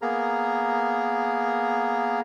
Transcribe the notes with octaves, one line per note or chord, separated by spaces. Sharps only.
A#3 B3 G#4 A#4 A#5